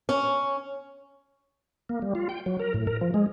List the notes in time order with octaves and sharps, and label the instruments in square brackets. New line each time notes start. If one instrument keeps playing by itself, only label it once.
[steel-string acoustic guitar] C#4
[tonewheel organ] A#3
G3
F4
G5
F#3
A#4
A2
A#4
F3
G#3